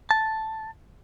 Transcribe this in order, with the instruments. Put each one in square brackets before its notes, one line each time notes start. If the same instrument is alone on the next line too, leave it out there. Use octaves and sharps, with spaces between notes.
[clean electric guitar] A5